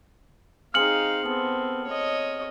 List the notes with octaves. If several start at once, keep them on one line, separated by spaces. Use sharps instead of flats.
C4 D#4 G#4 C5 F5 F6 C#7 F#7
B3 C4 A4
C#5 D#5